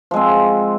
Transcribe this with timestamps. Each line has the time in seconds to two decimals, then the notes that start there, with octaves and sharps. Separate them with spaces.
0.11 F3
0.14 G#3
0.16 C4